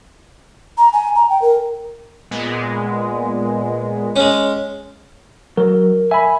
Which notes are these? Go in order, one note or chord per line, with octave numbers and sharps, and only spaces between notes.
A#5
G#5
A#5
G5
A#4
A#2 G#3 B3
G#3 C#4
F#3 A#4
E5 G#5 B5